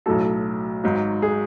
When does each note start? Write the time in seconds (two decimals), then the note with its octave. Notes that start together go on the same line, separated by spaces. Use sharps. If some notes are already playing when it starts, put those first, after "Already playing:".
0.06 B1 A2 F#3 A4
0.84 G#1 G#2 F#3
1.22 G#4